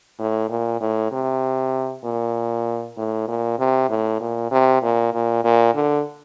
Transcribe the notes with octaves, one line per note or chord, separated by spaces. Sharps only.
A2
A#2
A2
C3
A#2
A2
A#2
C3
A2
A#2
C3
A#2
A#2
A#2
D3